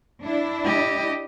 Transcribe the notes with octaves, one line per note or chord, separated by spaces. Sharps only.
D4 E4
G4 D#5